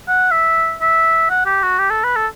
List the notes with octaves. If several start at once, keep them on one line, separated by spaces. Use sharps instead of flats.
F#5
E5
E5
F#5
G4
F#4
G4
A4
B4
A4